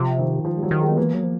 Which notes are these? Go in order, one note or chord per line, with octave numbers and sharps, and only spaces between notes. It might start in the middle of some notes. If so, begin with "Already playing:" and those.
Already playing: C3 F3
D#3
F3
G3
F#3
D#3
G#3
B3
E3 A#3
F#3
F3